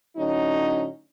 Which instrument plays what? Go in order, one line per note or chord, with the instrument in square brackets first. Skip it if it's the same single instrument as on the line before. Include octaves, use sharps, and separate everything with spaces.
[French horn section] A2 D3 F#3 C#4 D#4